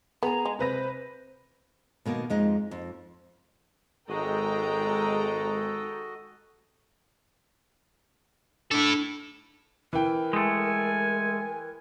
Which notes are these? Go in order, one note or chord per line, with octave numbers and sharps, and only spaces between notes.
B3 G#4 G#5 A#5
G#3
C3 B4 C5 A#6
B2 D#3 A#3
F2 G#3 D#4
F2
G#1 G#3 F#4 A4 D#5 G5 A#5
D4 E4 A4
E3 A#4 G5
G#3 A3 G#5